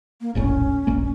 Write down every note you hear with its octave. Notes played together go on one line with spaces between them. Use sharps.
A#3
E1 A#1 A2 C#4
E1 A#1 A#3